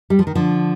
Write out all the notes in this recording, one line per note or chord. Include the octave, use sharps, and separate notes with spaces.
G3
F3
D#3
D3 F3